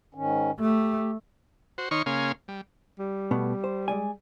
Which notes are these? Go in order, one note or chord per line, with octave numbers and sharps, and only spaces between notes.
G#2 D#3 C#4
A3 G4
F#4 C5
D#3 D#4 C#5 C6 C#6 F6
C#3 A#3 C#4 G#4 F5 C6
G3
G3
B2 A3 B3
C5
G#3 D5 G#5